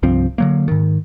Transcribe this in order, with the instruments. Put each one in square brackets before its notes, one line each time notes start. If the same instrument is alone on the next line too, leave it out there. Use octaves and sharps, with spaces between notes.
[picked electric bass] C2 G2 F3 C4
D3 F#3 A#3
G#2 D#3